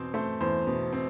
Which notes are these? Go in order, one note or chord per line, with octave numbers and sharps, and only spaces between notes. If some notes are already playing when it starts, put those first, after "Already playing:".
Already playing: E2 B2 C4 C5
A3 C5
E2 C5
B2
C4